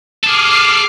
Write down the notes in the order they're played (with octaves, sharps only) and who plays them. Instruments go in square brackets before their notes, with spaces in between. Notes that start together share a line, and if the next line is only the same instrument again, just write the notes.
[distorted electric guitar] G#4 A4 [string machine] D6 F6 C7